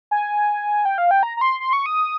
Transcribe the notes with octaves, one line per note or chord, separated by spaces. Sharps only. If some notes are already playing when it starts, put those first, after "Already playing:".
G#5
G5
F5
G5
A#5
A#5
C6
C6
C#6
D#6